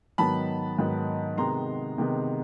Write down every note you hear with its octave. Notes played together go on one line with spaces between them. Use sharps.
G#2 D#3 F#3 B3 A5 B5
G#2 D#3 F#3 B3
C3 D#3 G#3 B3 A#5 C6
C3 D#3 G#3 B3